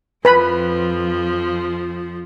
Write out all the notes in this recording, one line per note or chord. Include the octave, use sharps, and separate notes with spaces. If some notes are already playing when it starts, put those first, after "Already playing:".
F2 F3 B4 B5